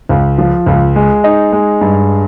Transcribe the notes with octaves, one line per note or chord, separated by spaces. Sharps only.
C#2
F3
C#2
G#3
D#4
G#3
G2